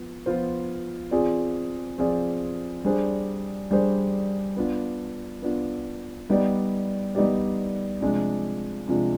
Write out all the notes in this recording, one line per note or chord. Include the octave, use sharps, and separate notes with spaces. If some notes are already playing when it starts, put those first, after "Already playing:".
Already playing: F3 B3
F3 B3 F4 C5
F3 C4 F4 G#4 D5
F3 C4 F4 G#4 D5
G3 D4 G#4 C5
G3 D4 G#4 C5
B3 D4 F4
B3 D4 F4
G3 B3 D#4 G4 D5
G3 B3 D#4 G4 D5
C3 F3 G#3 D4 F4
C3 F3 G#3 D4 F4